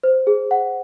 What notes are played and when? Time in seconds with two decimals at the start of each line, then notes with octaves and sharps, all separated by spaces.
0.03 C5
0.27 G#4
0.51 F#5